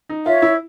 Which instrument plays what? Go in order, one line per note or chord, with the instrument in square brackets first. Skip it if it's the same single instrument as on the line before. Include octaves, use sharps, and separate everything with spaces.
[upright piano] D#4
[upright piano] F4 [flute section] C#5 E5
[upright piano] E4